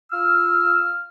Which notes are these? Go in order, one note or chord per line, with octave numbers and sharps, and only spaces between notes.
F4 E6 F6